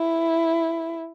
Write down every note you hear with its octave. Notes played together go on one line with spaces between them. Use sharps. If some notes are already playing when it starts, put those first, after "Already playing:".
Already playing: E4